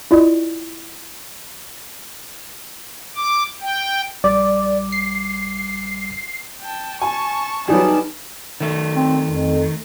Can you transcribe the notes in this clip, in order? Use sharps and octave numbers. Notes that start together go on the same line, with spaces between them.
E4 F4 D5 D#5
D6
G5
A#1 G3 D5 D6
C7
G5 A5
G#5 A5 C#6
F#3 G3 B3 D#4 G#4 D5 A5
D#3 A3
C4
F2